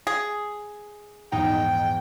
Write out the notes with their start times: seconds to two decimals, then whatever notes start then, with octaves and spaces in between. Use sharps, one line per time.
0.07 G#4
1.32 A#1 E2 G#2 D#4 G5